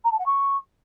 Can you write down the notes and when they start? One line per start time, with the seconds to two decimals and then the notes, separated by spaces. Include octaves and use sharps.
0.04 A#5
0.11 A5
0.18 F#5
0.26 C#6